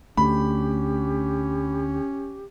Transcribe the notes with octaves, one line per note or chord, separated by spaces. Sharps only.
D2 A3 C#4 G4 B5